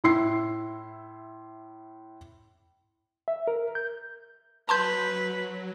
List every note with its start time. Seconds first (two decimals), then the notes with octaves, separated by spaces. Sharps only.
0.04 A2 E4 C6 E6 C7
3.28 E5
3.48 A#4
3.75 G6
4.69 F#3 B4 A5 C6 G6